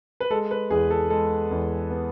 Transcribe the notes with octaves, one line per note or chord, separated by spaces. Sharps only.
B4
G#3 A4
B4
E2 G#4
A4
G#3 A4
E2
B3